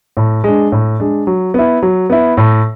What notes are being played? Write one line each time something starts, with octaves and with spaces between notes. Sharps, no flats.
A2
G#3 D4
A2
G#3 D4
F#3
B3 E4
F#3
B3 E4
A2